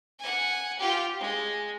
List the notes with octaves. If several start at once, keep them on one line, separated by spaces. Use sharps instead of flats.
F#5 G#5
F4 G4
G#3